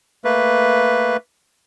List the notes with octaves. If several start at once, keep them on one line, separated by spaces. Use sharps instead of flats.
A3 A#3 B4